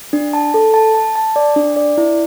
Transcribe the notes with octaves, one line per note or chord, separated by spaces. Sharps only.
D4
A5
A4
A5
A5
A5
D5
D4
D5
E4